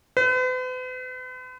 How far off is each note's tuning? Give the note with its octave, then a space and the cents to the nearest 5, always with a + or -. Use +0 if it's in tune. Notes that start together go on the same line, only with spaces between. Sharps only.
B4 +45